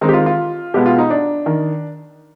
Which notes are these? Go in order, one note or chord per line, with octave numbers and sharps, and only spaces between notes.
D#3 G#3 C4 D#4
G4
F4
F4
B2 G#3 B3 G4
F4
D#4
D4
D#3